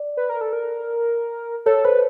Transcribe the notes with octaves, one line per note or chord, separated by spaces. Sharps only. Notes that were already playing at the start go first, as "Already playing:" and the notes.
Already playing: D5
B4
A#4
A4
A#4
A4 C#5
B4 C5